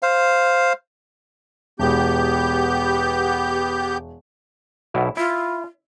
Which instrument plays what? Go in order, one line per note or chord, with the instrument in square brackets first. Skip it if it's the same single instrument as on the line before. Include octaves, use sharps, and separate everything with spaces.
[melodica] C5 F5
[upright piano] E1 [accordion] B3 G4 G6
[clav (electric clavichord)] B1 B2 E4
[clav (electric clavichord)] E4 [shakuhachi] F4